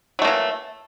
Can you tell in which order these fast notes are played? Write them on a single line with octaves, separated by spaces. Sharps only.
F#3 A3 A#3 E3